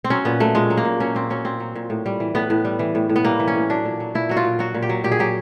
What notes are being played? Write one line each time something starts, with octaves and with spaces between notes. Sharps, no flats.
C4
F#3 C#4
A#2 B3
F#3 A3
A#2 G#3
F#3
A#3
A#2
F#3 C#4
A#2 C4
F#3 C#4
A#2 C4
F#3
A#2
A2
G3
E3
A2 B3
A2
G3
E3
A2
A2
B3
G3 A#3
E3
C#4
A2
F#3 D4
A#2
F#3
A#2 E4
F#3 F#4
F4
A#2
F#3 F#4
A#2
G4
F#3
A#2 G4
G#4
F#3 G4